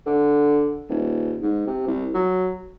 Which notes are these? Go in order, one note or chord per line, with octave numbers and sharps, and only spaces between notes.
D3
D#1
G#2
C3
C2
F#3